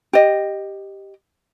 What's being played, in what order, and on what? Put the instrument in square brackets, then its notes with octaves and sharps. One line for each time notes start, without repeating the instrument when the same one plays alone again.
[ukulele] G4 D#5